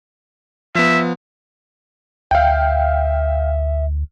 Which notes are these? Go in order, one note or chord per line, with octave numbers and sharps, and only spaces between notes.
F3 B3 E5
D2 E5 F5 G5